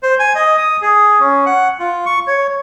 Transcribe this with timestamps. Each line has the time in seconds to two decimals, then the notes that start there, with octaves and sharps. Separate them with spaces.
0.03 C5
0.19 G#5
0.35 D#5
0.57 D#6
0.82 G#4
1.20 C#4
1.46 F#5
1.79 F4
2.06 C#6
2.27 C#5